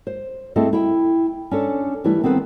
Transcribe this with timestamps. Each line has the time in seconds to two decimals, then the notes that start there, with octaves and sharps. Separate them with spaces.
0.07 C5
0.56 A3 C4 E4 G#4 A4 D#5
0.73 E4 G5
1.51 C#4 D4 A4
2.04 E3 G3 A3 E4 B4
2.23 D#3 B3 C4 A4 B4